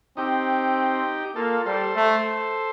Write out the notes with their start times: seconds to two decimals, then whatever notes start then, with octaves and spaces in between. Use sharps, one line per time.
0.17 C4 D#4 G4
1.36 A#3 F4 A4
1.66 G3 A4 C5
1.96 A3